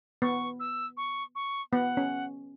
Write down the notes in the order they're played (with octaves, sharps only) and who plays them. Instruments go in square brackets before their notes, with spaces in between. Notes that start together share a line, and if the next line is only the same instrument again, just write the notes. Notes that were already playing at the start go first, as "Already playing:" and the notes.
[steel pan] B3 [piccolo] C#6
[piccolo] E6
C#6
C#6
[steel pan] B3 [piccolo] F#5
[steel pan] C#4